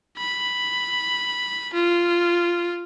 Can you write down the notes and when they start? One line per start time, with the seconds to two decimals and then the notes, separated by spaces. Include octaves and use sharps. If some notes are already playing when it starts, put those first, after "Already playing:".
0.18 B5
1.74 F4